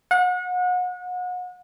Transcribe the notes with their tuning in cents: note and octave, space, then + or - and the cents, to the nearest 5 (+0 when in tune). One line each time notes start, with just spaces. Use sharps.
F#5 -35